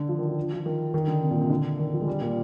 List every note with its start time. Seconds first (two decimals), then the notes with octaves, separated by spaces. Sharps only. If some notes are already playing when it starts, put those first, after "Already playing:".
Already playing: D3
0.09 F3
0.19 D#3
0.28 F3
0.53 F3
0.66 D#3
0.94 D#3
1.08 D3
1.23 C3
1.31 A#2
1.41 C3
1.50 D3
1.79 D#3
1.93 F3
2.01 G#3
2.08 G3
2.21 A#2